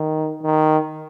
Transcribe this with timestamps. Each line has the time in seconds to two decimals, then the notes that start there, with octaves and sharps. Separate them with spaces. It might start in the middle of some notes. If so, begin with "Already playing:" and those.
Already playing: D#3
0.43 D#3